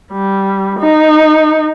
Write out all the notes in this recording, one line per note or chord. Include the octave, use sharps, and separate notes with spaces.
G3
D#4